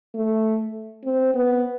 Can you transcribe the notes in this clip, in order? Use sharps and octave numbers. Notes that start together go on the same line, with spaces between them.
A3
C4
B3